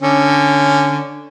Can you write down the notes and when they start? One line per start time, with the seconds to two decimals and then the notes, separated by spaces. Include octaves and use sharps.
0.02 D3 C#4